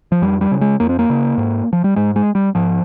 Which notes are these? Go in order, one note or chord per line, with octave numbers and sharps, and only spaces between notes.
F3
F2 G3
G3
C#3
G#3
F2 A#3
C4
A#3
C#3
G#2
F3
G3
G#2 G#3
G#3
G3
G#2 F3